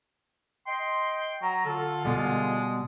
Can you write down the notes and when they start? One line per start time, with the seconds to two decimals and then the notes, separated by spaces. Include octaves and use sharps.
0.67 D#5 G5 C6
1.42 F#3 A#5
1.65 D3 F4 A4
2.05 B2 G3 G#3